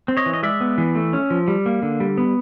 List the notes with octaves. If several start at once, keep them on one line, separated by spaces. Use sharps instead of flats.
C4
C#5 D#5
E3
D#5
G#3 D5 E5
B3
E3
A3
C#4
F3
G3
A#3
D3
G3
B3